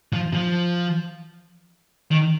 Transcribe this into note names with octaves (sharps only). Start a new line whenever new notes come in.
F3
F3
D#3